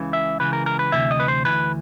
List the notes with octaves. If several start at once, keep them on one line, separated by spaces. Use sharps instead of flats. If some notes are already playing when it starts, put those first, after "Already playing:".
Already playing: C#2 C#3 E3
E5
C#2 C#3 E3 B4
A#4
A#4
B4
D2 C3 E3 E5
D#5
B4
C5
D2 C3 E3 B4